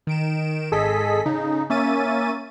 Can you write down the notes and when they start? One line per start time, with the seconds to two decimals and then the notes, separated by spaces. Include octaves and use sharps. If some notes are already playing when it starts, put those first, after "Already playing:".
0.07 D#3 D7 E7
0.72 G#1 G#4 A4 D#5 B6
1.26 C#3 D#4
1.70 A#3 C#4 E5 A6 D#7